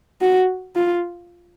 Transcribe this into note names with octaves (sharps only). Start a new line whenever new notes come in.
F#4
F4